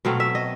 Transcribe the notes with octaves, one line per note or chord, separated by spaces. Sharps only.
B2 F#3 A3 C4 F5
E5
D#5